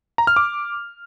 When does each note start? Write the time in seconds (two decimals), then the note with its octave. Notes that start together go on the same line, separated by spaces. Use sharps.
0.18 A#5
0.27 F6
0.36 D6